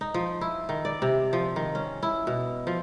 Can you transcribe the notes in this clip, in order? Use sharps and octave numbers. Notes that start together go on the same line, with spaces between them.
D#4
F3
E4
D#3
D5
C3
F3
D#3
C#4
E4
B2
F3